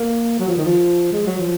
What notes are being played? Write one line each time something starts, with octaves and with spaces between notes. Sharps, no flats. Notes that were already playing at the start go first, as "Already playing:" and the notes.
Already playing: A#3
F#3
F3
D#3
F3
G#3
F#3
F3